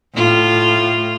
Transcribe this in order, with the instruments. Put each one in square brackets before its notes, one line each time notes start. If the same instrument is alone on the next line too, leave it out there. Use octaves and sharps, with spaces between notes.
[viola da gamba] A2 F4